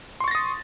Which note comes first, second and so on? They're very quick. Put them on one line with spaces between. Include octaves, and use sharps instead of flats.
C6 C#6 A6 A#6 D#6